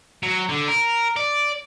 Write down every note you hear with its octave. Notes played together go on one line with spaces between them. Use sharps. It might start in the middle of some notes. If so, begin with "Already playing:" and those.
F#3
D3
A#4
D5